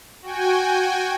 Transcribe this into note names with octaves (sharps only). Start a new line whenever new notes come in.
F#4 G5 G#5